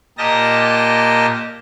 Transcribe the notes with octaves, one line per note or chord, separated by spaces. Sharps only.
A#2 G4 A#4 D#5 A5 A#6